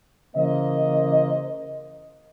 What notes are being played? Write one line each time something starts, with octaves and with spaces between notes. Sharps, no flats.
C#3 E3 A#3 C5 D#5